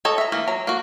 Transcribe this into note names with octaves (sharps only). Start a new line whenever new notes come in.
A4 C#5 D#5
E5 A#5
E3 A#3
F#3 A#5
A#3 F#4